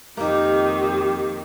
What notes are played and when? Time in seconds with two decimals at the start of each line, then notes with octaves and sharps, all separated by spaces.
0.17 F2 C3 D#3 A#3 D#4 G4